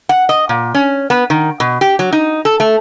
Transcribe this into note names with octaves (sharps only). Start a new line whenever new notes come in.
F#5
D#5
A#2
C#4
B3
D#3
B2
G4
F#3
D#4
A4
A3